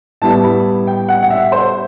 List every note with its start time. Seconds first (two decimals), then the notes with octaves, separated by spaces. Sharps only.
0.22 A2 G3 B3 E4 A5
0.44 B5
0.87 G5
1.09 F#5
1.23 F#5
1.30 E5
1.52 C5